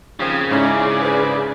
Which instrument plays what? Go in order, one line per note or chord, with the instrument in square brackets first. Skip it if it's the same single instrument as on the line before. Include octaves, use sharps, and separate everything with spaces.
[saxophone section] D#2 F3 C4 [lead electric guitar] C#3
[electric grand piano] G#2 E4 [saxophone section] C#4 [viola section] G#4 D5
[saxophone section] B4 C5